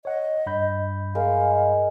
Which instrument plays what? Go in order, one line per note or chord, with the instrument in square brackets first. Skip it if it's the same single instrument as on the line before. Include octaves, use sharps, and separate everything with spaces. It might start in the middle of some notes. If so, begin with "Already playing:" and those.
[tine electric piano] C#5 F#5 [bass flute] D#5
[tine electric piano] G2 B5 G6
[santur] G#3 A#4 [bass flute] F5